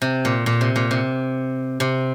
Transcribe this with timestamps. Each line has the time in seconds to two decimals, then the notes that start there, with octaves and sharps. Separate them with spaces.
0.02 C3
0.25 A#2
0.46 A#2
0.61 C3
0.76 A#2
0.91 C3
1.80 C3